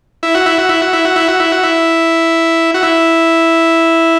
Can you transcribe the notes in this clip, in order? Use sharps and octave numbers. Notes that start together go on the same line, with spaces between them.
E4
F#4
E4
F#4
E4
F#4
E4
F#4
E4
F#4
E4
F#4
E4
F#4
E4